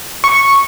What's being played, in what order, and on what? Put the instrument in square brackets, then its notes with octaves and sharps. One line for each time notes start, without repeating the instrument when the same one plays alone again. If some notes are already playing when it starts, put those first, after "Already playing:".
[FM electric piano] C#6